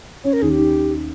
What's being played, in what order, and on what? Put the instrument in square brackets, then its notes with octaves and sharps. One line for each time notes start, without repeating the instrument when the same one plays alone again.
[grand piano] C#4 [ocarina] C#5
[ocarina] A#4
[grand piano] D#2 [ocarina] G#4
[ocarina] G4
[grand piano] D#3